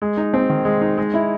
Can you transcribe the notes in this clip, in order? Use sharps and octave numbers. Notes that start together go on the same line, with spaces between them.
G#3
D#4
C4
D#3
G#3
D#4
G#3
E4